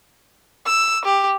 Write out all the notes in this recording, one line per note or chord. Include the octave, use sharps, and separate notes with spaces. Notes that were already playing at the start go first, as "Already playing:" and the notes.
E6
G4